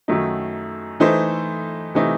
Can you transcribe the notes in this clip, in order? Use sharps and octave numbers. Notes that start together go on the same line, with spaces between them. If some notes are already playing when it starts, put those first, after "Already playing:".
F#2 D#3 F#3 A3 D#4
E3 A3 D#4 A4 C5
C3 E3 A3 D#4